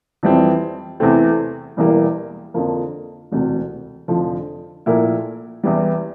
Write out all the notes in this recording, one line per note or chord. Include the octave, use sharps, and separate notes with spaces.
F2 E3 G3 C4
E2 C3 E3 A3 C4
E1 E2 E3 G3 A#3
F2 D3 F3 A#3
E1 D2 C3
F1 F2 D3 F3
A#1 A#2 A3 E4 A#4
E2 E3 G3